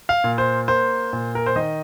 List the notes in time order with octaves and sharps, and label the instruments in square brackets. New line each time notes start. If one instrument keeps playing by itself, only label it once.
[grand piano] F5
A#2
C5
A#3 C5
A#2
A#4
C5
D#3 D#5